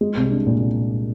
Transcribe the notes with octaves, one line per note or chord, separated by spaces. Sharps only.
G#3
C2
D4
A#2